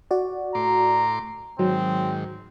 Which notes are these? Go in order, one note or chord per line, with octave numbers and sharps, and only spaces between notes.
F#4 D5
A2 A#5 C6 D6
G#2 D#3 F#3 C4